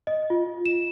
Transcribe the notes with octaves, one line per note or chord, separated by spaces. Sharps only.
D#5
F4
E7